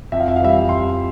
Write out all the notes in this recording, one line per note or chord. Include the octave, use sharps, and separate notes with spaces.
F2 E5
F5
E5
F5
E3 G3 E5
F2 C6